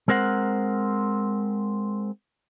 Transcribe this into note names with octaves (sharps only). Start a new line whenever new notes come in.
G#3 C4 A#4 C5 F#5